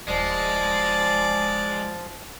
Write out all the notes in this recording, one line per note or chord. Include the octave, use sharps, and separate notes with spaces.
D#1 F3 G#3 D5